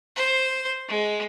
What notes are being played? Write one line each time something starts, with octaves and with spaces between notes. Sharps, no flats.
C5
G#3